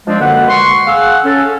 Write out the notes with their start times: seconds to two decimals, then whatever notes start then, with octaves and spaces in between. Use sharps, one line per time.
0.07 F3 G#3 C4 D4
0.20 F#2 D3 G#3 A#3 B4 F#5
0.49 C6 C#6
0.87 G#4 F5 F#5 E6
1.24 C#4 A4